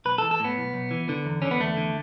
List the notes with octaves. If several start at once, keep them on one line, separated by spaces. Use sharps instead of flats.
B1 B4
E3 A4
A4
A2 B3
B1
B1
E3
D3
E2
D3 C#4
B3
E2 A3
D3